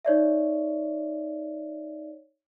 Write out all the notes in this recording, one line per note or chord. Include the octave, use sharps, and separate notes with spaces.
D#4 C#5 D5 E5